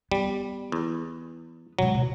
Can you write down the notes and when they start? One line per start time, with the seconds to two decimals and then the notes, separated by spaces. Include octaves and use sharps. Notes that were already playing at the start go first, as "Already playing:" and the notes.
0.12 G3 B3
0.72 E2
1.79 B2 F#3 G#3
1.95 B2